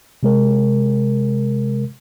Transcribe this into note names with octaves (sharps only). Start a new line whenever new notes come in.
C3 G#3 A#4